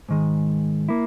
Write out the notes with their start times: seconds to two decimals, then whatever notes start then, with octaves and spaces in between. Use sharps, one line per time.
0.09 G#2 D#3 G#3
0.89 A#3 E4